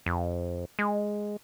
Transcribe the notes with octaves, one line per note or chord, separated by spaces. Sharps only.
F2
G#3